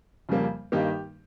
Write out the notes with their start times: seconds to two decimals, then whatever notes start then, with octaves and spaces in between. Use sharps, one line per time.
0.29 F2 C#3 G3 A#3
0.72 G2 D#3 G3 A#3 D#4 G4